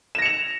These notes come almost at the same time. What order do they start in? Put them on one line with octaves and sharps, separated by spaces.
E7 A#6 C#7 F7